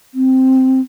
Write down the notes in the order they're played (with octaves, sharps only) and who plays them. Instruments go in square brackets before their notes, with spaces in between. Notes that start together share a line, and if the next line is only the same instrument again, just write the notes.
[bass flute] C4